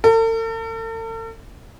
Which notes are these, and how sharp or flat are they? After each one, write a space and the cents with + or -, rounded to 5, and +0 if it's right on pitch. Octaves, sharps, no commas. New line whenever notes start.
A4 +45